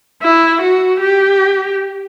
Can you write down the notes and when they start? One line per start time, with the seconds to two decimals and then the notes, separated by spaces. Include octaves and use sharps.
0.23 E4
0.62 F#4
1.01 G4